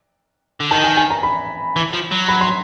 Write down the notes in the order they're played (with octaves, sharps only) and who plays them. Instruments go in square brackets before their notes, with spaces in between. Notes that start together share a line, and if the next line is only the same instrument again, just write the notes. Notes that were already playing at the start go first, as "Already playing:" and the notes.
[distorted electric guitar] D3
[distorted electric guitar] D#3 [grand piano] A5
[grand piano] G#5
G#5
A#5
B5
[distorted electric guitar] E3
F3
F#3
[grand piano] B5
C6